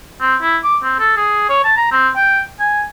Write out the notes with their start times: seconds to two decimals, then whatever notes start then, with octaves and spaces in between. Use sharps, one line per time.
0.21 C4
0.42 E4
0.64 D6
0.83 C4
1.00 A4
1.17 G#4
1.49 C#5
1.64 A5
1.77 A#5
1.92 C4
2.16 G5
2.60 G#5